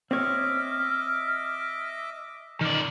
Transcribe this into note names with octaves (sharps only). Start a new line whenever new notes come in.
C4 C#5 D#5 E5 D6 F6
D#3 D5